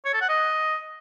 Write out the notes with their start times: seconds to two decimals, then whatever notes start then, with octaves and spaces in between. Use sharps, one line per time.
0.05 C#5
0.13 A4
0.21 F#5
0.29 D#5